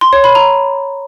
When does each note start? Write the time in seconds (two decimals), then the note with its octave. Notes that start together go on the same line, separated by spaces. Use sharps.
0.01 C6
0.13 C#5
0.24 B5
0.35 A#5